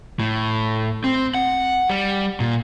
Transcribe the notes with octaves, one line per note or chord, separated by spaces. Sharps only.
A2
C4
F#5
G3
A#2